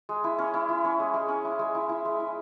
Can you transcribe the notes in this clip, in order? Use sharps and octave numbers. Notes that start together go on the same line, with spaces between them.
G#3
E4
C#4
E4
E4
C#4
G#3
G#3
C#4
E4
G#3
E4
E4
G#3
E4